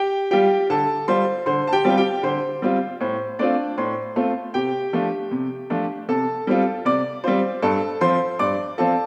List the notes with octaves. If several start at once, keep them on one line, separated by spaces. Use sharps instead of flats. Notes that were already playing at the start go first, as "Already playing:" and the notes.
Already playing: G4 G5
G3 F4 G4 G5
D3 A4 A5
G3 F4 C5 C6
D3 C5 C6
A5
G4 G5
G3 C4 F4
G4 G5
D3 C5 C6
G3 C4 F4
A2 C5
A3 C4 D4 F4 D5
A2 C5 C6
A3 C4 F4
C3 G4 G5
F3 A3 D4
C3
F3 A3 D4
C3 A4 A5
G3 C4 F4
C3 D5 D6
G3 C4 F4 C5 C6
G2 A4 A5
F3 C4 F4 C5 C6
G2 D5 D6
F3 C4 F4 A4 A5